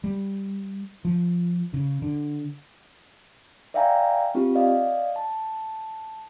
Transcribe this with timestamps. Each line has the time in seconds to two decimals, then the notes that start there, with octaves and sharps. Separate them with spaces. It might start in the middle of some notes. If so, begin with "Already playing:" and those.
0.04 G3
1.05 F3
1.74 C#3
2.02 D3
3.74 D5 E5 F5 G5 G#5 A#5
4.35 C4 F4 G4
4.55 D5 D#5 F5
5.16 A5